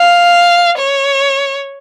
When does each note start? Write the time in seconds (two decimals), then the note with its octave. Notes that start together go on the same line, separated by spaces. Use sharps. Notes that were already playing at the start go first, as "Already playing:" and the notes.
Already playing: F5
0.79 C#5